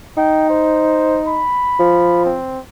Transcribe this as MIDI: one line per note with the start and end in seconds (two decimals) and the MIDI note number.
0.17 1.43 63
0.17 0.46 79
0.49 1.20 72
1.27 2.20 83
1.80 2.35 53
2.25 2.60 60